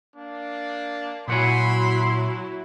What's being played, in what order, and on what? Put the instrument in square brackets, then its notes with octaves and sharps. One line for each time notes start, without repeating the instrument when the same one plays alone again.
[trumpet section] A#3 D4
[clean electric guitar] A#2 F#5 G#5 [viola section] F#3 E4 [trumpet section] B5 C6